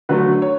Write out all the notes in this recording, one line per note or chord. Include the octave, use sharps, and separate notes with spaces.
D3 F#3 A3 B4
C#5